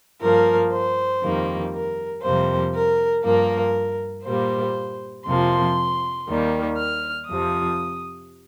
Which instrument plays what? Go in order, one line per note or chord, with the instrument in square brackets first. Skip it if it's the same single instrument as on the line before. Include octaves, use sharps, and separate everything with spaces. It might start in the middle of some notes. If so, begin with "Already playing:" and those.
[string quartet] G2 F3 A#3 A#4
C5
F2 D#3 G3 A#3
A#4
F2 C3 G3 A#3 C5
A#4
G2 F3 A#3 A#4
A#2 G3 A#3 C5
F2 C3 F3 A#3 C6
D#2 D#3 G3 A#3
F6
F2 C3 F3 D#6